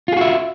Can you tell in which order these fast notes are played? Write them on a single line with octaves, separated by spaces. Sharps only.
F4 G#4 F#4 E5